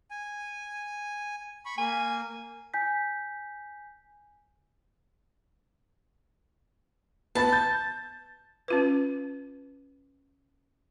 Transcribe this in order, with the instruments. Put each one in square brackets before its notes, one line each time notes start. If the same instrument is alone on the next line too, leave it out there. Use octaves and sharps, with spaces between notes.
[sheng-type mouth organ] G#5
B5 C#6
[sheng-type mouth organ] A#3 [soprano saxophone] G#5
[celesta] G#5 G6 B6
[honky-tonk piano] B3 B5 A6 [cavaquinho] A5
[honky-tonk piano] G6
[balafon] C#4 F4 B4